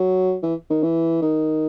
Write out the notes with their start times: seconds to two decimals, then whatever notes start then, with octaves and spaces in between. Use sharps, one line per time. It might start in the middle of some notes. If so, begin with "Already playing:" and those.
Already playing: F#3
0.43 E3
0.70 D#3
0.83 E3
1.22 D#3